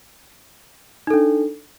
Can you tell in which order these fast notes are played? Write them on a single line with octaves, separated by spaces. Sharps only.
D#4 A4 D4